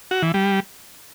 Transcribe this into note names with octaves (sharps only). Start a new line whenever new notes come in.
F#4
E3
G3